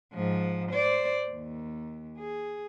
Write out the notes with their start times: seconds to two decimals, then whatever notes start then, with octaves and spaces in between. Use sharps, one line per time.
0.14 G#2 F3
0.72 C5 D5
1.31 D#2
2.18 G#4